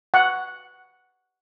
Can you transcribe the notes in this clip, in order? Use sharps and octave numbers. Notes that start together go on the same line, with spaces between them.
F#5